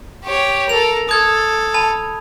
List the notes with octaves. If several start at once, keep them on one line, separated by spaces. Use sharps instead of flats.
G4 C#5
A4 A#4 F7
A4 D#6 G#6
A5 B5